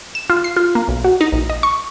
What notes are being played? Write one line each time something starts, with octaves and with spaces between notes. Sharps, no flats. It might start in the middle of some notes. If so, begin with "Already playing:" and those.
E7
F4
C7
F4
A#3
B1
F#4
D#4
A#1
D#5
C#6